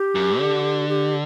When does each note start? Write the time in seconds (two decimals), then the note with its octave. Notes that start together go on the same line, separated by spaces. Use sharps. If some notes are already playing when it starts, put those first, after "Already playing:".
Already playing: G4
0.15 F#2
0.39 D3
0.89 G4